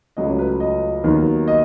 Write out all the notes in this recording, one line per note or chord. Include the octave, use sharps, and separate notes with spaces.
C#2 C#3 F#3 A3 D#5
C#5
B4
D#5
D#2 D#3 F#3 B3
D#5